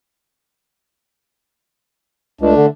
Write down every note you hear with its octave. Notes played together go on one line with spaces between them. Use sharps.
C#2 A3 D4
D3